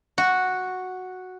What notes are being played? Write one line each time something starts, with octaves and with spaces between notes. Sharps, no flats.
F#4